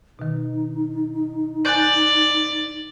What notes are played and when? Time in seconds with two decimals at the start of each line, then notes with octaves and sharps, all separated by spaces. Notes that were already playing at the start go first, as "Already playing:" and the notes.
0.19 B2 D#3 D#4
1.65 D5 G#5 F#6 G6